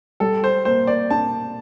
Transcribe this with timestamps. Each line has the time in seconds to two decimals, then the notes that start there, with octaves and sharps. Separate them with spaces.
0.20 G3 A4
0.44 C5
0.65 A#3 C5
0.87 D5
1.10 D4 A5